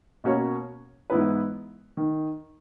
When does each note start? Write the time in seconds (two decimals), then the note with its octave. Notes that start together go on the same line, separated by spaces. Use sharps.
0.24 B2 A#3 C#4 F#4 C#5
1.10 G#2 E3 B3 E4 B4
1.97 D#3